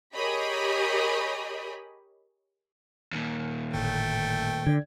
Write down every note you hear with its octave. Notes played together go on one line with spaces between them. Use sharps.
G4 G#4 A#4 C#5 D#5 B5
D#2 A#2
G1 A2 D3 A3 G5
D3 D5 G#6